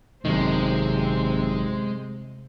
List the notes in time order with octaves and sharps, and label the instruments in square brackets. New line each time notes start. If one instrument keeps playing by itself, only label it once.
[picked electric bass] G#1 F#2 D#3 [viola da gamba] C3 C4 C5 [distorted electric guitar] G#3